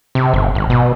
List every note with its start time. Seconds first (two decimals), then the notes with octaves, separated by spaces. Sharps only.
0.15 C3
0.34 G1
0.55 G#1
0.70 B2